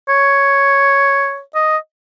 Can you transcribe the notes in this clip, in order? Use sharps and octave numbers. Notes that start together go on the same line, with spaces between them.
C#5
D#5